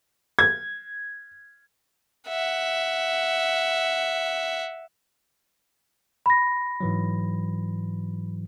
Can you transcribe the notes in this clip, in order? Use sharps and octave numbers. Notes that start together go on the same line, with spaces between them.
G#6
E5 F#5
B5 A#6
G#2 E3 F#3